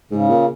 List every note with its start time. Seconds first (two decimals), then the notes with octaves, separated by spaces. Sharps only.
0.11 G#2 C#3
0.29 A#2